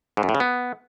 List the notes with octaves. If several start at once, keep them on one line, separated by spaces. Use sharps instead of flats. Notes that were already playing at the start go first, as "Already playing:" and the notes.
G#2
F#2
A2
C#3
B3